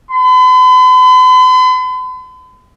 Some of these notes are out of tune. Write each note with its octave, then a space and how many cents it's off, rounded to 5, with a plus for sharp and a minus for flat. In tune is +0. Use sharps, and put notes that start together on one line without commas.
B5 +45